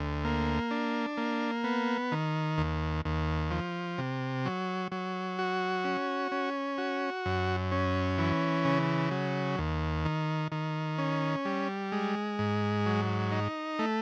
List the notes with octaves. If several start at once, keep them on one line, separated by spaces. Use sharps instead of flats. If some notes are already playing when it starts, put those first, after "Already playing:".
Already playing: D2
A#3
D4
A#3
B3
D#3
D#2
D#2
F3
C3
F#3
F#3
F#4
C#4
C#4
F#4
F#2
C#4
E3
C#3
F#3
D#2
D#3
D#3
C#4
G3
G#3
G#2
F#3
D#4
A3